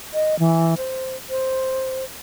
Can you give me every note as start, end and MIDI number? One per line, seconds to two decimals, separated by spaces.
0.14 0.38 75
0.39 0.74 52
0.78 1.16 72
1.30 2.05 72